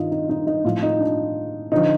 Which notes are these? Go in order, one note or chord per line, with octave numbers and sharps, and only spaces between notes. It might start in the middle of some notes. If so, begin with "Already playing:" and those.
Already playing: G2 D#3 D#4 F4 D#5
D#4
D#4
D#4
A2 F3 F4
D#4
D4
D3 F3 D#4